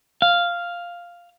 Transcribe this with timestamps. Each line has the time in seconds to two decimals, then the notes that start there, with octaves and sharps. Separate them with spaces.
0.22 F5